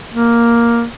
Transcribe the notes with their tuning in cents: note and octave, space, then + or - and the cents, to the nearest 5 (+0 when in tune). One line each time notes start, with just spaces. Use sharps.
A#3 +5